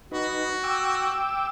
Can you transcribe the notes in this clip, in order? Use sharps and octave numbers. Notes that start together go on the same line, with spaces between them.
D#4 F#4 B4
G5 D6 E6